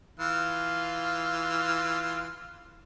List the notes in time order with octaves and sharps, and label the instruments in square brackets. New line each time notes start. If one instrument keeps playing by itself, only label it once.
[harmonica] E3 F4 F6